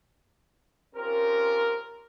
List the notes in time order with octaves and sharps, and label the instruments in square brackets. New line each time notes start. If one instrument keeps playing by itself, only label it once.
[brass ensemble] C4 C#4 F4 G4 A#4